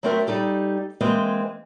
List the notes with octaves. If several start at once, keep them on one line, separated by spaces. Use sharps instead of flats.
F#3 A3 C4 F#4 A#4 E5
G3 D#4 G4 A4
E3 G#3 A#3 C4